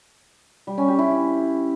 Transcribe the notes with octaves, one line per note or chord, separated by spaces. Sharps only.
G3
C#4
G4
E4